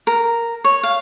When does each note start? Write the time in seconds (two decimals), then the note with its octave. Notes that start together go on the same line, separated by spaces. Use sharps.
0.07 A#4
0.64 C#5
0.83 F5